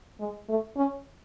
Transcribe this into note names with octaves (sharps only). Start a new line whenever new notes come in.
G#3
A3
C#4